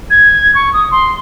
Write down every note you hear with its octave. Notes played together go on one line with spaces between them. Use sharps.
G#6
C#6
D#6
C6